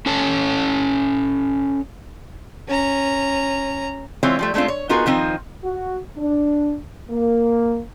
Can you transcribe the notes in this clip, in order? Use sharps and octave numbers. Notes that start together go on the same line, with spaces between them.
C#4 A4 C#5 A5
C#4 A#5
E3 G#3 C4 F4 C#5
F3 G3 A3
G#3 A3 C4 D4 F4
C#5
B3 D#4 F4 F#4 G#4 A#4
D#3 F3 C4 D#4
F#4
D4
A#3